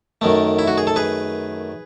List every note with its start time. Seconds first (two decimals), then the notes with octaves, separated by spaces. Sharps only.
0.21 F#2 D#3 A3
0.59 E4
0.68 F#4
0.78 G#4
0.87 A4
0.96 G#4 B4